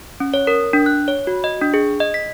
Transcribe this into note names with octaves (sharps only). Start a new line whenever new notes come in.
C#4
C#5
A#4
D4
F#6
C#5
F#4
D#5
D4
G#4
D#5
B6